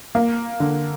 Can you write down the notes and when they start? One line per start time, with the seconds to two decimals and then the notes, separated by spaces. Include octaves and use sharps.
0.15 A#3
0.60 D3